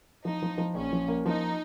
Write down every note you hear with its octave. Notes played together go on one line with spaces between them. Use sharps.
F3 D#4
F3
F3
A#1 C#4
F3
A#3
F3 D#4